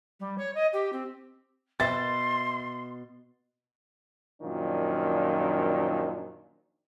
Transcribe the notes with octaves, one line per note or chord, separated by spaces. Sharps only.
G3
C#5
D#5
G4
C4
B2 E5 C6 A6
F#2 A#2 D#3 F3 D4